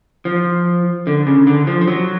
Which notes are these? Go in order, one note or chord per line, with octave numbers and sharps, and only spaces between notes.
F3
D3
C#3
D3
F3
F3
F#3